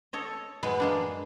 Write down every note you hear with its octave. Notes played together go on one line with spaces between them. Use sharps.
A4 C#5 D#5
F#2 G#3 B4
G#3 A#3 D4